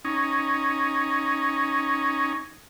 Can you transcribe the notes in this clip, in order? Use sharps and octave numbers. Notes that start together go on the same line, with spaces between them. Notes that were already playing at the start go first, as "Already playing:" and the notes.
C#4 D#4